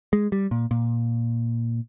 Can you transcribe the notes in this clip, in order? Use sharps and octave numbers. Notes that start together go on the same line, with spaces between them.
G#3
G3
A#2
A#2